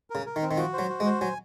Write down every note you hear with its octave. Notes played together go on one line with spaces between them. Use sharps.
C#3 A#4
A#4
D#3
C4
D#3
F3 F#4
C5
F#3
F#4
G#3
C5
F#3 G#5